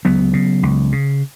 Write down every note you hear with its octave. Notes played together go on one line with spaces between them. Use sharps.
C#2 F#3 B3
C#3
C#2
C#3